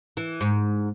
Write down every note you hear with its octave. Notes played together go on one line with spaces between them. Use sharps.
E3
G#2